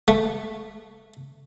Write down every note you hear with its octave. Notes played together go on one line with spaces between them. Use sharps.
A3